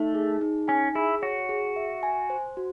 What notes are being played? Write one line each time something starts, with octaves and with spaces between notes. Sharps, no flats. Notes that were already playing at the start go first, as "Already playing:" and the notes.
Already playing: A3 D#4
G#4
D#4
C#4 G#5
E4 G#4
F#4 C#5
G#4
E5
G#5
C5
F#4